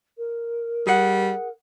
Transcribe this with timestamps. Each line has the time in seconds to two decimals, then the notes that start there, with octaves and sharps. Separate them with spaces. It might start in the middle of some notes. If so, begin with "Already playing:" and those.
0.17 A#4
0.87 G3 G#4 F#5